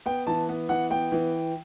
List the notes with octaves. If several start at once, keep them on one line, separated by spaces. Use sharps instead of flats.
B3 G5
E3 A5
B3
E3 F#5
B3 G5
E3